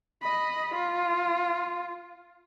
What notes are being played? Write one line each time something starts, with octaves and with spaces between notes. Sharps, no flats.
D#5 B5
F4